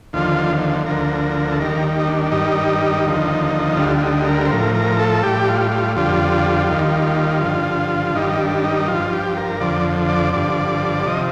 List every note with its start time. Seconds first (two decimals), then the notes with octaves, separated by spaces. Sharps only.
0.13 D#2 D3 F3 F4
0.86 D2 D3 F3 A#4
1.52 A4
1.59 D#2 D#3 G3 A#4
1.99 D#4
2.07 D4
2.31 G2 D#3 G3 D#4
3.05 D#2 D3 F3
3.77 D2 D3 G3 F4
3.97 F4
4.02 D#4
4.26 A#4
4.46 C5
4.51 A2 F3 A#4
4.74 A#4
4.99 A4
5.23 A2 G3 G4
5.48 F4
5.71 F4
5.96 F2 D3 G3 F4
6.69 D#2 D#3 G3
7.41 G2 D3 F3
8.15 G2 D#3 G3 D#4
8.22 F4
8.29 D#4
8.40 D4
8.64 D#4
8.88 G2 F3 F4
9.13 G4
9.37 A#4
9.60 F2 D3 F3 D5
10.09 D5
10.33 G2 D3 F3
11.06 C3 F3 D#5